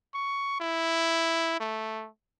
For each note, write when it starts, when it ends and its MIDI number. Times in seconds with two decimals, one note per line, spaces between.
0.14 0.58 85
0.60 1.59 64
1.60 2.08 57